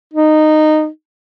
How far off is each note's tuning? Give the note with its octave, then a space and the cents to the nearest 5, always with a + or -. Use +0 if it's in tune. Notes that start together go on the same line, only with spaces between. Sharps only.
D#4 -15